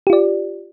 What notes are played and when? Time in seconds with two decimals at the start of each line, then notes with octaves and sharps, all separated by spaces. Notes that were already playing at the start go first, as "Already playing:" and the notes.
0.07 G4
0.10 F4
0.13 D5